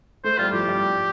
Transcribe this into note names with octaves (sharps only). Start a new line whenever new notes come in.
A3 C5
G3 F4
F3 G4
G3